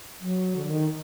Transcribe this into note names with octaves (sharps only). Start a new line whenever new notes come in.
F#3
D3
D#3